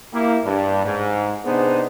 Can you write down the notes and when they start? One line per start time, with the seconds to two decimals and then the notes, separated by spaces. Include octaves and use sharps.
0.12 A#3 E4 G4
0.43 G2
0.84 G#2
1.44 C3 B3 D4 D#4 G#4 C5